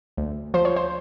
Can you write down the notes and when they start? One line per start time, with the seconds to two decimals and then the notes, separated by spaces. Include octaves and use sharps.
0.17 D2
0.54 F3 C5
0.65 C#5
0.76 C5